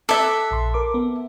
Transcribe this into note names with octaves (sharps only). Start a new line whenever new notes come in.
A4 E5 D6 F#6
A#1 C6
A#4 D6
B3